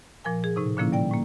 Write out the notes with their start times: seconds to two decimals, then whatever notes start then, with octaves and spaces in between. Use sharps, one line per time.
0.24 A#2 F3 A#4 G#5
0.44 G#4
0.56 A2 C3 D#4
0.77 A#2 D3 F3 A#3 C#4 E4
0.92 G3 D5 G5
1.11 A2 A#3